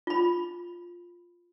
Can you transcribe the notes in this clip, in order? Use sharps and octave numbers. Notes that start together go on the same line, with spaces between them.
F4 B5